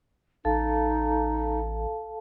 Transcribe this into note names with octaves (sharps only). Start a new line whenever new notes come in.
A1 D#4 A4 F5 A5